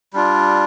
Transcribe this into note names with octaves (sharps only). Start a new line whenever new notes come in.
G3 D4 F4